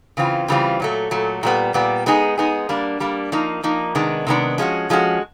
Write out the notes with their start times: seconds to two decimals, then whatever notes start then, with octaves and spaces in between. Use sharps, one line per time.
0.17 C#3 E3 C4 F4
0.48 C#3 E3 G3 C4 F4
0.80 A#2 F#3 A3
1.11 A#2 F#3 A3
1.43 A#2 G3 B3
1.74 A#2 G3 B3
2.06 G#3 B3 D#4 G#4
2.38 G#3 B3 D#4 G#4
2.69 G3 A#3 D4
3.00 G3 A#3 D4
3.32 F3 A#3 D#4
3.63 F3 A#3 D#4
3.95 C3 D#3 G#3 B3 D4
4.27 C3 D#3 G#3 B3 D4
4.58 F3 G#3 C#4 F#4
4.90 F3 G#3 C#4 F#4